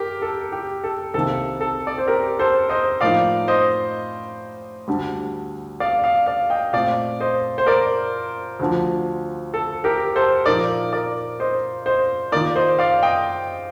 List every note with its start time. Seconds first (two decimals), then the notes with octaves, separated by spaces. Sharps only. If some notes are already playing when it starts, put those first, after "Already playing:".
Already playing: G4 A#4
0.22 A4
0.52 G4
0.84 A4
1.14 C2 C3 D#3 A#3 A4
1.61 A4
1.87 D5
1.98 C5
2.08 G4 A#4
2.39 A4 C5
2.69 C5 D#5
3.01 A2 F3 A#3 D#4 D5 F5
3.48 C5 D#5
4.88 D2 D3 G3
5.80 D5 F5
6.04 D5 F5
6.27 D5 F5
6.50 D#5 G5
6.73 A#2 A3 C4 D5 F5
7.20 C5 D#5
7.58 C5
7.67 A#4 D5
8.59 D2 D3 F3
9.54 A4
9.84 G4 A#4
10.16 A4 C5
10.46 A#2 F3 A#3 D#4 A#4 D5
10.93 A#4 D5
11.40 C5 D#5
11.86 C5 D#5
12.32 D#2 D#3 A#3 F4 A#4 D5
12.56 C5 D#5
12.79 D5 F5
13.03 D#5 G5